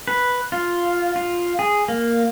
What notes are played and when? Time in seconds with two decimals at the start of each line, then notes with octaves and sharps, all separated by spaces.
0.08 B4
0.52 F4
1.16 F4
1.59 G#4
1.88 A#3